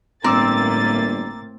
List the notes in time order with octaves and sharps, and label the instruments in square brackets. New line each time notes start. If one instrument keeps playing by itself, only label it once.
[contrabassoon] G1 [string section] A2 A#3 A6 [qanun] C4 [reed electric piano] A#5 D6 E6